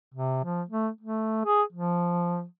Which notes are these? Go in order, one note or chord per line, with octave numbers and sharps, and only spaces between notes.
C3
F3
A3
A3
G#4
F3